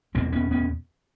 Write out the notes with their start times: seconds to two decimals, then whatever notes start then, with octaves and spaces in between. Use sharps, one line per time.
0.14 E2 B2 A#3 C4
0.32 B3 C#4
0.51 B3 C#4